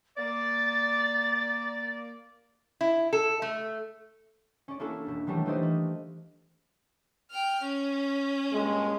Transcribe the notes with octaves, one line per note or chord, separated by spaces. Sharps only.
A#3 D5 A6
E4
A4
A3
C#4 D5
A#3 C#4 D4 E4 F#4 A4
E1 E4
D#3 E3 F#3 G3 A3 D4
D#4 E4 B4 C5 D5 D#5
A#3
G5 F6
C#4
G2 A#2 G#3